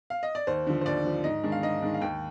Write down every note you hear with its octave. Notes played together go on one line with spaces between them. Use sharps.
F5
D#5
D5
D#2 C5
D3 F3
C5
D#2 D5
D3 F3
G#2 D#5
D#3 G#3 D4
F5
G#2 D#5
D#3 G#3 D4
F5
D#2 G5